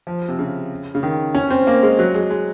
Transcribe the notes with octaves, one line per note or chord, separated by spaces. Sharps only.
F3
C3
C#3
C#3
D#3
C#4
C4
A#3
G#3
F#3
G#3
G#3